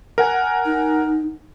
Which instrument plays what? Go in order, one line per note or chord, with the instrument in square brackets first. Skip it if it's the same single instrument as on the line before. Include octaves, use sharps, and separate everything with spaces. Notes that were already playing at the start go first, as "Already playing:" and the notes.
[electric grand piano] A#4 F#5 G#5
[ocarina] D#4